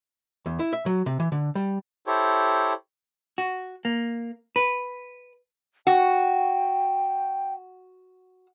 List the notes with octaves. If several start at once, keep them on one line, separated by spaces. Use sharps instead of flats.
E2
E4
E5
F#3
C3
E3
D3
G3
E4 G4 A4 C5 C#5
F#4
A#3
B4
F#4 G5